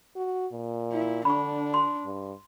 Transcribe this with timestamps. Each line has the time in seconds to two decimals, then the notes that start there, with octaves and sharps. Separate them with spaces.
0.16 F#4
0.52 A#2
0.93 E4
1.25 D3 D4 B5 C#6
1.74 C6
2.05 G2